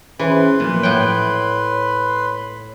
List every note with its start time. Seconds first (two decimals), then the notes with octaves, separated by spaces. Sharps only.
0.19 E3 C#4 G#4 B4 C5 B5 C6
0.60 A#2 F3 F#3 A#3
0.83 A2 C#5 F#5 G5